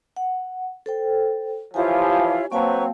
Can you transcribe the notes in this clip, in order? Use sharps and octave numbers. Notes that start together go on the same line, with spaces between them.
F#5
A4 C5 G5
E3 F3 E4 F4 G4 C#5 G#5
F#3 A#3 C4 B4 C#5 F5 A5 C#6